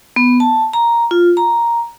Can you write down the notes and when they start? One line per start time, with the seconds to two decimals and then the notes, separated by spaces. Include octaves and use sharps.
0.16 B3
0.40 A5
0.73 A#5
1.11 F4
1.37 A#5